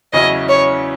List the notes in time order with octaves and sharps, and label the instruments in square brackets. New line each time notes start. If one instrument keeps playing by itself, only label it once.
[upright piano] E2 C#3 F#3 C#4 E4 [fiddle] D#5
[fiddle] C#5